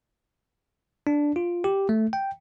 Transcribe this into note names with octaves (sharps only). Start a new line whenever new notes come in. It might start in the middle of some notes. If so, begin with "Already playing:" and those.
D4
F4
G4
A3
G5